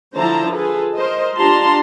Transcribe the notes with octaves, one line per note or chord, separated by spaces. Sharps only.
D3 F3 E4 C5 A5 A#5
F4 G#4 A4 B4
A#4 C5 D#5
D4 F4 G4 A5 A#5 C6